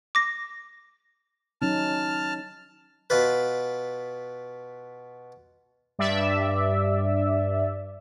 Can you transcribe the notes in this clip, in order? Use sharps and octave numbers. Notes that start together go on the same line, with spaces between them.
D6 A#6
F#3 C#4 D#4 A5 F6
B2 F4 B4
G2 D5 E5